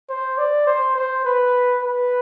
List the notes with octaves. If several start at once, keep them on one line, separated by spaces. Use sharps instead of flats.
C5
D5
C5
C5
B4
B4